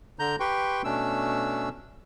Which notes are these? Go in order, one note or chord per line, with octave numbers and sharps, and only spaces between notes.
D3 A#5 G6
G4 B4 G5 C6 C#6
B2 A3 C#4 D4 E6